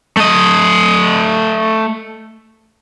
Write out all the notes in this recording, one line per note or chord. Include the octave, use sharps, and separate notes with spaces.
A3 D#5